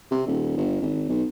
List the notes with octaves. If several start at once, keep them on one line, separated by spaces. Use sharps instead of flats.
C3
D#1
G1
G#1
B1